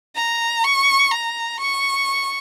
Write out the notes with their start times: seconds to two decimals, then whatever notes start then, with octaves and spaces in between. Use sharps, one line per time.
0.16 A#5
0.64 C#6
1.11 A#5
1.60 C#6